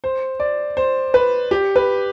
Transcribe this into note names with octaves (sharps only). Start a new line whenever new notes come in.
C5
D5
C5
B4
G4
B4